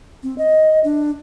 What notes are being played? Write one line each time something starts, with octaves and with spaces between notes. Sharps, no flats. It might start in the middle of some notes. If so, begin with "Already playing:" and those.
C4
D#5
D4